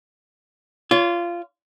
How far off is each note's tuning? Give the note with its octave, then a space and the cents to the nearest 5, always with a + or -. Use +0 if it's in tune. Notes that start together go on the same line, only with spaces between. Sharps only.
F4 -15 C#5 +35